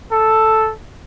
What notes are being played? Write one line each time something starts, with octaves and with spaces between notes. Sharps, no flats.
A4